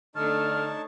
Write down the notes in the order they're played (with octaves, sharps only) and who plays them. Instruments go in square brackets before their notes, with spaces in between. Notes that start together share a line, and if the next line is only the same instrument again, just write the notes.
[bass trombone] D3 [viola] A3 D4 [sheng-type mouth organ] D#4 C#5 A5 [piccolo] F6